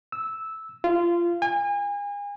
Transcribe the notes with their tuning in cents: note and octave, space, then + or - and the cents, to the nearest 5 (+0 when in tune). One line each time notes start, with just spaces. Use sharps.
E6 -10
F4 -20
G#5 -35